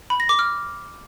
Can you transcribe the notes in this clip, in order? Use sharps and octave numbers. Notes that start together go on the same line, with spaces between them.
B5
A#6
D6
F6